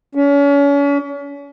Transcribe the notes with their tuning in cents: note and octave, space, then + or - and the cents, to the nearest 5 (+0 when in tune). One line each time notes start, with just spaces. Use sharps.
C#4 +35